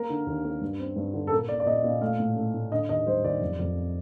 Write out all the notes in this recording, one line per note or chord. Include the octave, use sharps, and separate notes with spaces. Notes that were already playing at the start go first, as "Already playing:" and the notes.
Already playing: A#3 A#4
D3
D#2
A#3
G2
C4
G2
D3
A4
A#2 A#4
A#2 D5
D5
A#2 D#5
A#2
A3 F5
A2
A3
A2
D3 D#5
D#2 D#5
G3 C5
D#2 D5
F2
F2